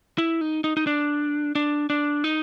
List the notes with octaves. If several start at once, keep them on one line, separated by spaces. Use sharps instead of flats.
E4
D#4
D#4
D#4
D4
D4
D4
D#4